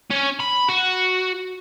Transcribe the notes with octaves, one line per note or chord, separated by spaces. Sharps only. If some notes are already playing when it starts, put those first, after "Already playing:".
C#4
B5
F#4